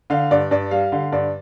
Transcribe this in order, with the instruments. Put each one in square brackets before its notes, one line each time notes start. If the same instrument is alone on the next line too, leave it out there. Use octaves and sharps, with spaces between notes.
[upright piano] D3 F5
G2 D5
G2 D5
G3 F5
D3
G2 D5